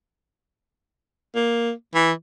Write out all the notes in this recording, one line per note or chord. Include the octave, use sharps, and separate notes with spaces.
A#3
E3